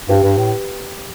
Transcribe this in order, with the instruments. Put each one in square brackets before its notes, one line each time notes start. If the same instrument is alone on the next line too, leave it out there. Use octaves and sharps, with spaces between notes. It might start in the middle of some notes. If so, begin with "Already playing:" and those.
[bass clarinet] G2 [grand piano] G4 B4
[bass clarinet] G2
A2